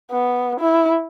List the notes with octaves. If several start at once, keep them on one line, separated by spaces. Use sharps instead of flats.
B3
E4